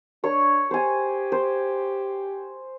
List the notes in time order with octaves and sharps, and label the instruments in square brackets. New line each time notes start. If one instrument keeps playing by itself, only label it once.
[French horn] D4 [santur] C#5 C#6
[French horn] G4 [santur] C5 G#5
[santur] C5